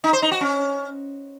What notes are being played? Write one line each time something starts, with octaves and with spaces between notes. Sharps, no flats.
D#4
C5
D#4
F#4
C#4